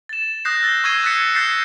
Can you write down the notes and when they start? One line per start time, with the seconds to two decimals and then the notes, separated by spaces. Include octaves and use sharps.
0.09 A6 E7
0.45 D#6 F#6 G6 A#6 C7
0.63 E6 A6
0.84 C#6 D#6 E6 G#6 C7 D#7
1.03 D#6 F#6 G#6 A6 B6 C#7
1.35 E6 F#6 G6 A6 B6 C7